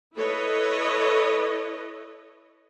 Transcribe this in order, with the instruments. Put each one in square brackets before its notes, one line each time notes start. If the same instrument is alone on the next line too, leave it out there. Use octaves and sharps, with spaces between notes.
[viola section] E4 A4 B4 C#5 D#5